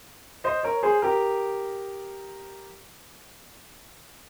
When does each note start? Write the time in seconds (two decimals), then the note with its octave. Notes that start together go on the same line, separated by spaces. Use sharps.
0.44 C5 D#5
0.63 A#4 C#5
0.83 G#4 C5
1.02 G4 A#4